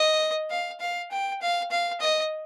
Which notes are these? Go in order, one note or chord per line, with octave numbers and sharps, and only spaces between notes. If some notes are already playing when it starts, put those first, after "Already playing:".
Already playing: D#5
F5
F5
G5
F5
F5
D#5